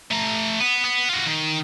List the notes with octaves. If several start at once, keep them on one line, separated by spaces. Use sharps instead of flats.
A3 A#5
B3
B3
F4 F#4
D#3